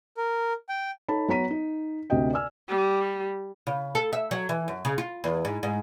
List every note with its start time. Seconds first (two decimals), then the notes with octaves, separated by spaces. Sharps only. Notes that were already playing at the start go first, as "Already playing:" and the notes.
0.17 A#4
0.69 G5
1.08 D#4 A4 C#5 A5 B5
1.28 F#3 B3 C#5 A#5 B6 D#7
1.51 D#4
2.10 D2 C3 F#4 D#5 G5
2.33 D5 G#5 E6 F6
2.69 G3
3.67 C#3
3.95 A4
4.13 E5
4.31 F#3
4.49 E3
4.68 F#2
4.85 C#3
4.98 F4
5.24 E2
5.45 G#2
5.63 G#2